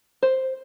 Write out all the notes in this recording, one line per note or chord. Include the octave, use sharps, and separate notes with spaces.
C5